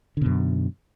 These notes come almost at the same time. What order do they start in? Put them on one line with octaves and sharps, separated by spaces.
D3 B2 F#2